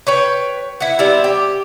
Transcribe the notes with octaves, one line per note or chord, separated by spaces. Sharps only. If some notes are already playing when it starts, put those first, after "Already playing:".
B4 C#5 G5
E4 F#5
G3 B3 C4 E4
G4